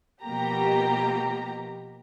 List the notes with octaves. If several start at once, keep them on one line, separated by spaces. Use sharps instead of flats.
B2 F3 A#3 G4 A#5